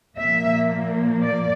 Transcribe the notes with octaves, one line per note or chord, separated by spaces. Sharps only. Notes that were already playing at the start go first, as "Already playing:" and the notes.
A#2 F3 A#3 E5
D5